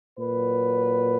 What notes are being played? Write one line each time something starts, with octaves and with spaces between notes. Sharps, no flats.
A#2 F#3 B4